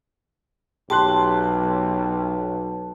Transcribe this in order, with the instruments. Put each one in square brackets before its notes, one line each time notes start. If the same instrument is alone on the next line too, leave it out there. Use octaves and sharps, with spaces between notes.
[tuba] B1 [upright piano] G4 C6 F#6 [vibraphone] A5